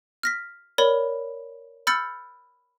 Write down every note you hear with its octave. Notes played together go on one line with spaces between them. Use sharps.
F6 A#6 B6
A#4 C#5 D5 B5
B5 E6 F6 G6 A6 C#7